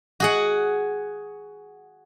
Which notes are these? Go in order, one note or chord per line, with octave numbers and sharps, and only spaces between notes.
F#4 G#4 F#5